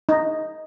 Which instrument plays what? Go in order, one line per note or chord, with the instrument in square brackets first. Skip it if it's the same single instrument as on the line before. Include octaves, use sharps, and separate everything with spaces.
[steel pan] D#4